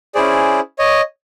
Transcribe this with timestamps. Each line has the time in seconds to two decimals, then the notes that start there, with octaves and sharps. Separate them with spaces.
0.15 C#4 E4 G#4 C5 D5
0.79 C#5 D#5